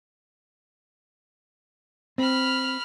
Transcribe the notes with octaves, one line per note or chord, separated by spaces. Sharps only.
C4 B5 F6